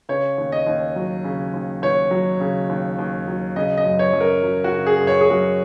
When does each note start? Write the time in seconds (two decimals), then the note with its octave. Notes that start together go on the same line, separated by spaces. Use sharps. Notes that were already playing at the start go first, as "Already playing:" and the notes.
0.09 C#3 C#5
0.38 D#2
0.52 D#5
0.67 D#2
0.96 F#3
1.24 C#3
1.53 D#2
1.82 D#2 C#5
2.11 F#3
2.40 C#3
2.69 D#2
2.99 D#2
3.27 F#3
3.56 C#3 D#5
3.77 D#5
3.85 F#2
3.99 C#5
4.13 F#2
4.21 A#4
4.43 F#3
4.64 F#4
4.72 C#3
4.86 G#4
5.01 F#2
5.07 C#5
5.21 G#4
5.30 F#2 F#4